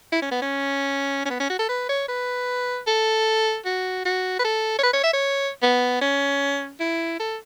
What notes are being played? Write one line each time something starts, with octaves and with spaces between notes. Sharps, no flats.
E4
C#4
B3
C#4
C#4
B3
C#4
F#4
A4
B4
C#5
B4
A4
F#4
F#4
B4
A4
C#5
B4
C#5
E5
C#5
B3
C#4
E4
A4